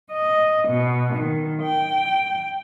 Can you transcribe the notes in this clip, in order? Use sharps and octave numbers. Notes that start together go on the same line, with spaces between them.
D#5
B2
D#3
G5